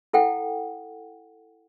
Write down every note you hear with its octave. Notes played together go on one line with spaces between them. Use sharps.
E4 A4 F#5 G5